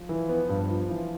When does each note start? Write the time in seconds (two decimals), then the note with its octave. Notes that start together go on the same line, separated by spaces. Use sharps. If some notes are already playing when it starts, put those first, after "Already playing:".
Already playing: F3
0.09 E3
0.29 B3
0.49 G2
0.70 F4
0.89 E3